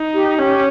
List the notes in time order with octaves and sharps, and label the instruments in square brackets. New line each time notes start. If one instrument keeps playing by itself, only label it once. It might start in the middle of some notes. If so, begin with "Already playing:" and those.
Already playing: [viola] D#4
[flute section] G4
[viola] C#4 [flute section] G4